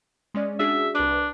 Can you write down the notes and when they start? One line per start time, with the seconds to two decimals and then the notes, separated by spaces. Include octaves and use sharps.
0.34 G#3 C#4 D5
0.60 D4 F#4 G#4 E5
0.95 C2 D4 B4